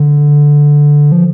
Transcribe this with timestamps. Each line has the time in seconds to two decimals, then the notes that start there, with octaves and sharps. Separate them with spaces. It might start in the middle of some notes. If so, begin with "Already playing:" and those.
Already playing: D3
1.12 F3